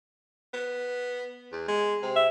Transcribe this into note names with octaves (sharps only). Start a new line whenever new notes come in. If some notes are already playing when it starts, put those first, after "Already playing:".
B3
E2
G#3
C3
E5